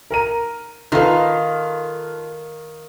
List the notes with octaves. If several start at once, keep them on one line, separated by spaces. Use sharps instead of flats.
A#4 A#5 D#7
D#3 F4 A4 B4 F5